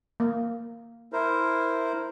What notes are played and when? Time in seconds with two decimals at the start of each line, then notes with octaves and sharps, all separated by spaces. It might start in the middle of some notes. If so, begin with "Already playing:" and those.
0.20 A#3
1.13 E4 A#4 C5